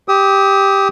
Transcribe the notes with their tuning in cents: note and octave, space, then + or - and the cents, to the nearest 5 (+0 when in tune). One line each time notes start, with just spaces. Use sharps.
G4 +0 D#6 +35